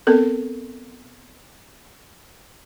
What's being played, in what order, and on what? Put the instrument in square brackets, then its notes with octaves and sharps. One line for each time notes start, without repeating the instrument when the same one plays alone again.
[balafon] B3 C4 A4 A#4